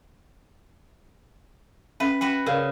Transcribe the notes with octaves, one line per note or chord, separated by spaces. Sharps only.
C#4 B4 E5 F#5
F#4 B4 F#5 G5
C#3 A#4 D5 F5